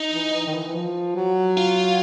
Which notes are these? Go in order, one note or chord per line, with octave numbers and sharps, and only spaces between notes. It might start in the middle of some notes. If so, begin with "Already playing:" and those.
Already playing: D#4
E3
E3
D#3
E3
E3
F3
F#3
F4